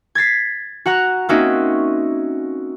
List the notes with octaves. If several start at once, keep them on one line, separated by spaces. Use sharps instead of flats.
G#6 A6 B6 C7
F#4 F#5 A#5 F#6
A#3 C4 C#4 D#4 F#4 E5